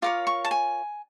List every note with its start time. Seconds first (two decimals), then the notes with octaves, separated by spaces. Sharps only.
0.02 F4 A#4 C#5 D6
0.27 C#6
0.45 A5
0.51 G#5